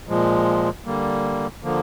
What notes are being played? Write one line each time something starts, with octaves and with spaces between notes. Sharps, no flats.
A#2 F3 G#3
D3 G3 A#3
D3 F3 A#3